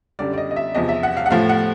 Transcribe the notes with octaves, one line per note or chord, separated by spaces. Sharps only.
F#2 D3 G3 D5
D5
D#5
D#5
E5
E2 C3 F3 D#5
E5
F#5
F5
F#5
A2 F3 A3 F5
F#5